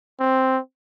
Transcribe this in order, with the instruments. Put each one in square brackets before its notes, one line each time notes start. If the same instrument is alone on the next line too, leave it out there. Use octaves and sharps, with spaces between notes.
[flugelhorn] C4